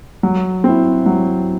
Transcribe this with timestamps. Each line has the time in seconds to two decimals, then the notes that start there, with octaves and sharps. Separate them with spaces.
0.23 F#3
0.64 C4 E4
1.06 F#3